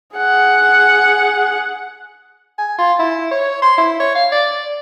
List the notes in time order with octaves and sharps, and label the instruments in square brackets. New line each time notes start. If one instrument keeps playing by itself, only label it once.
[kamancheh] G#4 F#5
[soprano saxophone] G#5
F4
E4
C#5
C6
E4
C#5
F5
D5